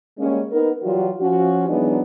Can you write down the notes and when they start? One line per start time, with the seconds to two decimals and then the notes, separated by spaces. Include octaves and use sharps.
0.19 G3 G#3 A#3 C#4
0.52 B3 D#4 A#4
0.83 E3 F#3 G3 F4 F#4
1.20 F3 C#4 F#4
1.69 E3 F#3 G#3 B3 D4 D#4